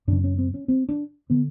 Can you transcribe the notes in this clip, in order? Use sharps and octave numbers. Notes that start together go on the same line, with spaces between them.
F#2 C#3 D4
C#4
C4
C#4
C4
D4
D3 B3